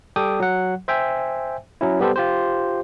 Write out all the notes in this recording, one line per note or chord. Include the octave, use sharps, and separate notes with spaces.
G3 A4 G5 D6 D#6
F#3 F#5
C5 E5 G5 G#5
F#3 C#4 E4
G3 B3 G4 A4 C5
F4 G4 C5